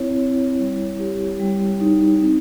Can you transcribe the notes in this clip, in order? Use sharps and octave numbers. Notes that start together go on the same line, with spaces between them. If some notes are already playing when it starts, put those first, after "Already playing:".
Already playing: C4 E4 C#5
C#5
G3
G4
G3
D#4
C4